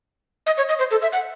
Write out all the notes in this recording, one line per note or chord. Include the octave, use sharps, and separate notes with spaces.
D#5
C#5
D#5
C5
A4
E5
F#5